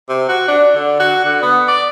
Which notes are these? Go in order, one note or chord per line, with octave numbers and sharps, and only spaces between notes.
C3
F#4
D4
D3
F#4
D3
B3
D5